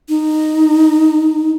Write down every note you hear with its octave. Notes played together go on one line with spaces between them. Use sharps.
D#4